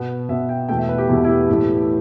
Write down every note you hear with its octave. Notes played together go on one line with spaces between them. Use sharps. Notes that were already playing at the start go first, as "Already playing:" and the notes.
Already playing: B2 B3
B2 B3 E5
G5
E2 B2 A3 G5
E5
B4
G4
E2 B2 A3 E4
E4
G4
A2 E3 A3